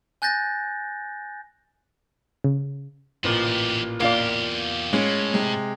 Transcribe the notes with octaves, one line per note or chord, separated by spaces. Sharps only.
G#5 F#6 G6 A6 A#6
C#3
A1 A#2 F3
E3 G4
E2 A#3 F4 G4 D5
A2 G#3 C#4
C3 G#3